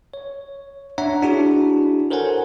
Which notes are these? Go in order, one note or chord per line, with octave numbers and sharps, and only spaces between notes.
C#5
D4 C#5 E5 F#5 A#5
D4 E4 F#4 G#4
A4 A#4 C5 C#5 F#5 G#5